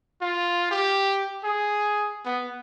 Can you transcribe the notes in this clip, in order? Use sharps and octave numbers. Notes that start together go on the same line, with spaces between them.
F4
G4
G#4
B3